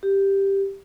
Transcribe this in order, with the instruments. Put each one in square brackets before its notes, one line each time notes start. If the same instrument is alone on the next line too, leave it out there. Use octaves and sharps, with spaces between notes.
[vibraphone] G4